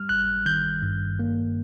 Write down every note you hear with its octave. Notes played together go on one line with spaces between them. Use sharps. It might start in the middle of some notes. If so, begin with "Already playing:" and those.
Already playing: G3 F6
G#1 F#6
D#3 G6
G2
A#3